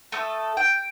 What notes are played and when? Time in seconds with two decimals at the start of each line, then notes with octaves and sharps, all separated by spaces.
0.12 A3 A4 D#6
0.57 G5